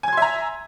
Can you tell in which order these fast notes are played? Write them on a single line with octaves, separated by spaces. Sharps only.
G#5 G#6 C6 E5 A#5